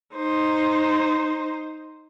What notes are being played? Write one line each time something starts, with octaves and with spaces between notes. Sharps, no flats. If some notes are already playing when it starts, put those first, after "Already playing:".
D#4 C5